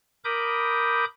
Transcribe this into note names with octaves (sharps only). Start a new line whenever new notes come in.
A#4 B5 D6 D#6 G6